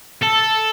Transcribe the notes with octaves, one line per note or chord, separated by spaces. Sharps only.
A4